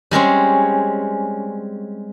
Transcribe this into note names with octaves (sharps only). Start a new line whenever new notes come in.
G3 G#3 C4 C#4